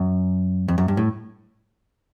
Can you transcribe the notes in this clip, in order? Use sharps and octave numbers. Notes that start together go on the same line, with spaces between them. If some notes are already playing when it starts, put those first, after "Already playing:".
Already playing: F#2
F2
F#2
G2
A2